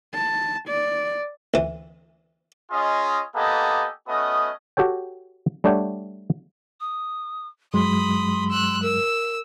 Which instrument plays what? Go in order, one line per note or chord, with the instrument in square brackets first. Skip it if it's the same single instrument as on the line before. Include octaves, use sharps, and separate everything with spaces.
[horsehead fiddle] A5
D5
[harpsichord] D2 E3
[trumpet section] C#4 F4 G#4 D#5
A#3 B3 G4 A4 D#5 G#5
A3 B3 C#4 F#4 D#5 D#6
[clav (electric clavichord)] F#4 G4 A4 C#5 G5
G3 A3 D4 C#5 F#5 G5
[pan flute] D#6
[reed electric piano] G2 F#3 G#3 [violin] B5 D#6 [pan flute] C6
[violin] E6 F#6
[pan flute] A#4 [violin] E6